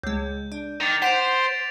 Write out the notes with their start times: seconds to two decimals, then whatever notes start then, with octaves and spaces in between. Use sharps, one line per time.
0.03 C#2 G#3 G6
0.52 D4
0.80 D#3 D6 A6 F7
1.02 C5 F#5 B6 D7 F7